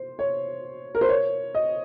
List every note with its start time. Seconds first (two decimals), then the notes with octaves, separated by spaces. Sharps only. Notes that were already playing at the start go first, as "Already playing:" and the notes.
Already playing: C5
0.19 C#5
0.95 A#4
1.01 C5
1.09 C#5
1.55 D#5